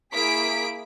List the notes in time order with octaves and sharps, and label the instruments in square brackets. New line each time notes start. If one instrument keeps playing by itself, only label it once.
[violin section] A#3 E4 G#4 B6 D7